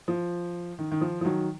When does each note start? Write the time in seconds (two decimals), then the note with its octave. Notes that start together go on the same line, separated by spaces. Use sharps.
0.08 F3
0.79 D#3
0.92 D#3
1.01 F3
1.21 F3
1.25 D#3 F#3